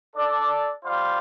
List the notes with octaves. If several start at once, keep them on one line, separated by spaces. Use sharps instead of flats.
D4 A4 D5
G3 F4 C5 F5